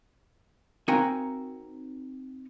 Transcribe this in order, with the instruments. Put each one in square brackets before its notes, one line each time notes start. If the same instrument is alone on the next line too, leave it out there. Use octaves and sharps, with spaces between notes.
[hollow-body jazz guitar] C4 D#4 F#4 A#4 F5 G#5